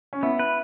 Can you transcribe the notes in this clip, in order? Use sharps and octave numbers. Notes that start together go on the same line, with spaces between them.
C#4
B3 E4
B4